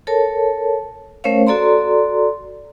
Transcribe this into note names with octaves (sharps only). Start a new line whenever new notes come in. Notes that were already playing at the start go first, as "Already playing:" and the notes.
A4 A#4 C#5 A5
A3 C#4 A#4 C5 C#5 F5
F#4 A4 D5 A#5 C6